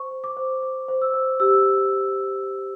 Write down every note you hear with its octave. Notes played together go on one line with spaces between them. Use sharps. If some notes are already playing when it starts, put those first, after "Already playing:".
Already playing: C5 C#6
C5
D6
C5
C5 D6
C5
E6
C5
G4 E6